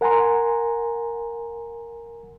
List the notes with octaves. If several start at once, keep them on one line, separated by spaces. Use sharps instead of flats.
A#4 F#5 G#5 A#5 C6